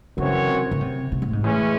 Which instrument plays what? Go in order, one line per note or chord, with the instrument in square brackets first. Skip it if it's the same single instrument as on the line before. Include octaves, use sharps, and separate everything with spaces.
[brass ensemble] F#2 E3 C4 F#4 C#5 [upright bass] C#3
[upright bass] C3
C#3
C3
C3
A2
G#2
[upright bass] A2 [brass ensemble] E3 G#3 C#4